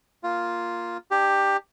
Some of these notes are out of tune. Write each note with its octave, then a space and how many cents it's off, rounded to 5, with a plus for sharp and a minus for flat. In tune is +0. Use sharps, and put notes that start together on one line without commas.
A#3 +0 F4 +0
D4 +25 G4 +10